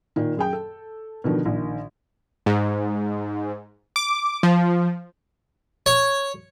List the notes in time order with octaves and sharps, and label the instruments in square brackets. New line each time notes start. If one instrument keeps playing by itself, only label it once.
[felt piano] A#2 D#3
F#2 G#4 G5
A4
B2 D3 D#3 F3
A#1 D#3
[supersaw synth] G#2
D6
F3
[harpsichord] C#5